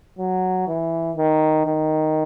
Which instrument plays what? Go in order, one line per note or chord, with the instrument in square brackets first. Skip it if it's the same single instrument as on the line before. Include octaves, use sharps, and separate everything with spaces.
[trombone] F#3
E3
D#3
D#3